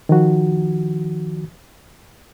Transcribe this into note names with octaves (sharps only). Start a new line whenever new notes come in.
D#3 F3 F#4